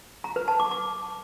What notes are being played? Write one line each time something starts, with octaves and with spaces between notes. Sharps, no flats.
A#5
B4
A5
D6
D6